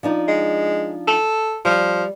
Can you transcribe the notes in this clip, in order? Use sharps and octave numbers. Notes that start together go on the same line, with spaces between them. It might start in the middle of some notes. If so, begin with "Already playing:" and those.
F3 D4 D#4
G#3
A4
F3 G3